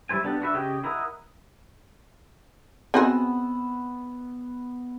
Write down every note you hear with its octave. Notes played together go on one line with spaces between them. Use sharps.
G3 E4 C5 G#5
B3 D4 G4 A4
D4 F#4 B4 E5
C#3 G4 C#5 D#5 G5
E4 A#4 D#5 F#5 D#6
B3 C4 F#4 G#4 E6